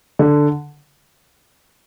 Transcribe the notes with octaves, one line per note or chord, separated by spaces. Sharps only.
D3